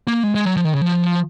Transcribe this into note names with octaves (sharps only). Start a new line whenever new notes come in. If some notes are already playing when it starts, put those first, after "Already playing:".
A#3
G#3
G#3
F#3
F3
D#3
C#3
F3